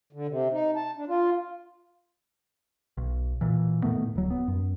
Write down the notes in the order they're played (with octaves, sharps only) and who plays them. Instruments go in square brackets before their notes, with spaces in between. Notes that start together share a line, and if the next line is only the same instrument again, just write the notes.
[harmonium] D3
C3
D#4
A5
D4
F4
[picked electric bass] B1
A#2 E3
A2 D#3 A3 B3
D1 F#3
B3
F#2